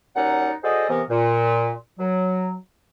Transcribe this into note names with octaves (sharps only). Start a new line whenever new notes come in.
D#2 F#3 C#4 D#4 D5 F#5
F#4 G#4 A4 C5 D5 D#5
C3 E3 B3 A#4
A#2
F#3